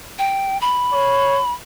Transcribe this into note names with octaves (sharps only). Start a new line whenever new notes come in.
G5
B5
C#5